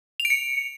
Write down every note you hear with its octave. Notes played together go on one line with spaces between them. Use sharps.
F7
D7
C#7